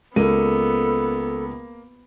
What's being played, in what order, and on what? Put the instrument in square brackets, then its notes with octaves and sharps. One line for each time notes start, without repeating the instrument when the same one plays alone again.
[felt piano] C#2 D#7 [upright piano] A#3 [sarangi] B3 [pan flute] A4